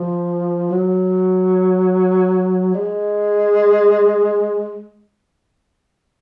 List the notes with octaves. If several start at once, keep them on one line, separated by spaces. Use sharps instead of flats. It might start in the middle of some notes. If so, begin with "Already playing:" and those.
Already playing: F3
F#3
G#3